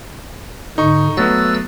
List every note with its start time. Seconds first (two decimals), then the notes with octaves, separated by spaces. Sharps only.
0.78 G#2 D3 D#4 C#6
1.17 F#3 A3 B3 E6 F#6 A6